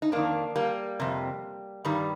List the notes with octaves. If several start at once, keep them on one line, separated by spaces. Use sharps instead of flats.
D#4
F2 D#3 A#3 D4
G3 A#3
F2 C3
G2 D#3 G3